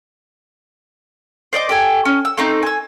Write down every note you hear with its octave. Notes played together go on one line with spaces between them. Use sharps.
C5 D5 D#5 D6
G4 A4 G#5
C#4
E6
A3 C4 D#4
G#5 E6